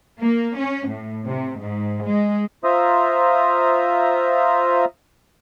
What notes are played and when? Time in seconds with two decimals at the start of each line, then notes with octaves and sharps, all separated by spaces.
0.21 A#3
0.58 C#4
0.89 A2
1.27 C3
1.61 G#2
2.04 G#3
2.64 F4 C5 E5 A#5 D#6